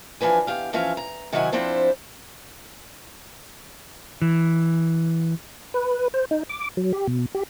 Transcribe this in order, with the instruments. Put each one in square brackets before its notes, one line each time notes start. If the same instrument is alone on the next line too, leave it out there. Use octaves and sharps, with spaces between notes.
[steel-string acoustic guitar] E3 F3 D4 B4 G#5
E2 G4 F5
E3 F3 C#4 E5 F5 G#5
A#5
C3 D#3 F#3 E4 F#5 G#5
F3 C4 D4 E4 A4 C5
[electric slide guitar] E3
[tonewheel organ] B4
C5
D#4
D6
F#3
G4
B2
G4